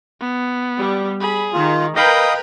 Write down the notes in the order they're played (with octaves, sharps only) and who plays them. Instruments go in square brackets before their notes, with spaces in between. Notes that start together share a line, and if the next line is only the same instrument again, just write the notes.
[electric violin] B3
[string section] G3
[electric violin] G#4 [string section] B5
[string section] D#3 [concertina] F4
[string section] A#4 B4 [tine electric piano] D#5 F5 B5 [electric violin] G5 G6 [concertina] D#6